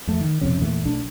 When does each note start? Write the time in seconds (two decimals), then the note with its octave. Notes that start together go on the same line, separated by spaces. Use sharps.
0.07 F2 A3
0.21 D#3
0.41 B1 F2 C3 C#4
0.60 E2 A#2 E3 A3
0.85 B1 A3 D4